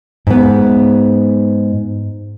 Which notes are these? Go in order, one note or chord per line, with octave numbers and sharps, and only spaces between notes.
G#2 B3